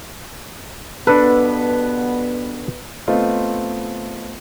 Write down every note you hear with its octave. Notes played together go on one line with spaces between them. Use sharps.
G2 B2 B3 D4 A4 B4
A3 B3 C4 F4 D#5